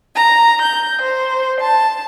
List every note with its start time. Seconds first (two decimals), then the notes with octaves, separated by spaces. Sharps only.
0.14 A#5
0.61 G6
1.01 C5
1.60 A5